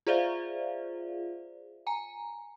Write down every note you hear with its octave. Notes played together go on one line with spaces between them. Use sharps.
F4 G#4 C5 D5 E5 F5
G#5 A#5